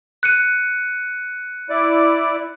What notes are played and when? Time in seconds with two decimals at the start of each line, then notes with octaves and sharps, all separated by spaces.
0.23 F#6 C#7 D#7
1.70 E4 D5